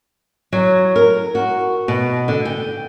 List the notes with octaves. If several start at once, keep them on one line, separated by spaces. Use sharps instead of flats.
F#3
A#4
F#4
B2
D3
G5